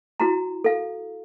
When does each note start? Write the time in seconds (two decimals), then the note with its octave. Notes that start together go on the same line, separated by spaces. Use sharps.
0.20 E4 F#4 A#5
0.64 A4 F5